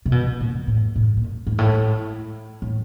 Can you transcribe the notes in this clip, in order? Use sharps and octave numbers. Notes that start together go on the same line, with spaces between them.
C3
B2
A#2
A2
A2
A#2
G#2
A2
A2